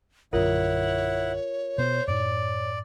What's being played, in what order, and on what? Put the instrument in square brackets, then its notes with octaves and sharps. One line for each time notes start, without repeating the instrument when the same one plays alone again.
[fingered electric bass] A#1 F#2 D3 [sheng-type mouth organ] E4 F#5 [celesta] F4 A#4 [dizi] C#5
[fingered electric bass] B2 B3 [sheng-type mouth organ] C5
[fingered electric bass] F#2 A2 [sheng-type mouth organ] D5